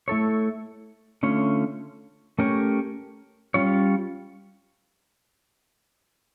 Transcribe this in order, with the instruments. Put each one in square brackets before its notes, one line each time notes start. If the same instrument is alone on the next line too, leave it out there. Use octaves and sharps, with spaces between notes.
[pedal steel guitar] A3 E4 A4 C#5
D3 A3 C#4 F4 C#5
A3 C#4 G4 A#4 C#5
G3 C#4 F4 C#5